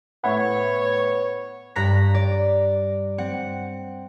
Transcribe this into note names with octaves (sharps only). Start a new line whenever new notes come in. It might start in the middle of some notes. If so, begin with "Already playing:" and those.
A2 B3 C#5 E5 F#5 B5
G2 A#5 F#6 A#6 B6
D5
C4 F#5